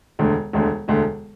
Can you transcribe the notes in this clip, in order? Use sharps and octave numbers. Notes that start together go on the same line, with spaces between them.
E1 D2 D3
E1 D2 D3
E1 D2 D3